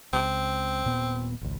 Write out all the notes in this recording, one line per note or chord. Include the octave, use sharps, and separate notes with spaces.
C#2 C4
D#1 A#2 B3
G#1 C#2